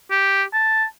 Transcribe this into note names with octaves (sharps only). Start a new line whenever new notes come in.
G4
A5